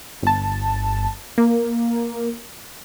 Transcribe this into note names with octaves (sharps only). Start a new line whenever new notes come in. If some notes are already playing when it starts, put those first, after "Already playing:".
G1 A5
A#3